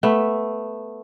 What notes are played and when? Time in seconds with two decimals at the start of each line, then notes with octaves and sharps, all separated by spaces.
0.03 A3 B3